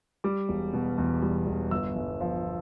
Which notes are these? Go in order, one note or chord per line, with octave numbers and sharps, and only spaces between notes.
G3 D6
E1
B2
E2
G3
E1
G1 E6
G1
F3